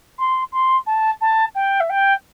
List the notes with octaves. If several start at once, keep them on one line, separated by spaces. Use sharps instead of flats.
C6
C6
A5
A5
G5
E5
G5